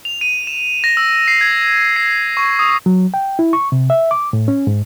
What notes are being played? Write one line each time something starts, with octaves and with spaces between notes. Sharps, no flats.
F7
D#7
E7
A#6
E6
C7
G#6
C7
C#6
D#6
F#3
G5
E4
C#6
C3
E5
D6
A2
C#4
G#2